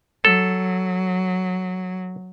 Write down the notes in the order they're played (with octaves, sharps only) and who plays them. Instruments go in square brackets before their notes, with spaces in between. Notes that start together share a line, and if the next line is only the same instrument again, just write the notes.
[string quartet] F#3 [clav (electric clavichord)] A4